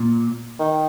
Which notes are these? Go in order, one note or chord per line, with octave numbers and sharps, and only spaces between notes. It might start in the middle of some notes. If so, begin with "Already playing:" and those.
Already playing: A#2
D#3